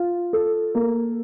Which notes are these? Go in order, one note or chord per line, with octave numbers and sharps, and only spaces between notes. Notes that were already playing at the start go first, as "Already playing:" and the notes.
Already playing: F4
A4
A#3